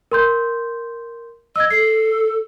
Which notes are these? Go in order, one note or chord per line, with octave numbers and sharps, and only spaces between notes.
A#4 C6 G6
D#5 E6 G#6
A4 C7